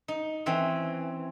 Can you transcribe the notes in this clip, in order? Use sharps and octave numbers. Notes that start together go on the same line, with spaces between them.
D#4
E3 C4 C#4